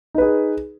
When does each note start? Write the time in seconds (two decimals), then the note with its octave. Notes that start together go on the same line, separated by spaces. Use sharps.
0.15 D#4
0.18 B4
0.22 G#4